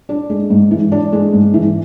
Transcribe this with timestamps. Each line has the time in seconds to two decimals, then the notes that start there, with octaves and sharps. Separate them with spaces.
0.09 D4
0.30 G#3
0.50 G#2
0.71 E3
0.92 D4
1.13 G#3
1.33 G#2
1.54 E3